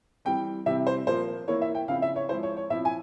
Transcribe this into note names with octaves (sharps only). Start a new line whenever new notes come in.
E3 G3 C4 G5
C3 E3 G3 C4 E5
C5
A#2 F3 A#3 C5
E3 A#3 E4 C#5
E5
G5
C#3 F3 C4 E4 F5
E5
C#5
F3 G#3 E4 C5
C#5
C#5
A#2 F3 C4 E4 E5
G#5